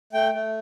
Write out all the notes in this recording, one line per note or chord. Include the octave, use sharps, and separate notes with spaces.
A3 G5
A3